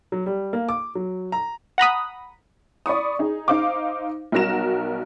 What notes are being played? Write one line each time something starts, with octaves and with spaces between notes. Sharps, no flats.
F#3
G3
A#3
D6
F#3
A#5
F#5 A#5 B5 D#6
D5 B5 C#6 D#6
D#4 G#4
D#4 C5 F5 D6
B1 G3 F#4 A#4 A#6 E7